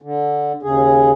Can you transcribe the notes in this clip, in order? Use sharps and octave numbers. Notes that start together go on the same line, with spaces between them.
D3
D#2 C#3 G#4